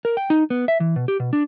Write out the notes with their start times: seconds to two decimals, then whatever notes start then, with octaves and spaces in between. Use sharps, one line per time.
0.05 A#4
0.17 G5
0.30 D#4
0.50 B3
0.68 E5
0.80 E3
0.96 B2
1.08 G4
1.20 B2
1.33 D4